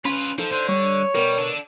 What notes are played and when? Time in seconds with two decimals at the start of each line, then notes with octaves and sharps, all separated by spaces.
0.05 C#4 F4 B4 B5
0.38 F3 D#4 A4
0.52 D3 C5
0.68 G3 C#5
1.15 B2 G3 A#4
1.38 D4 A4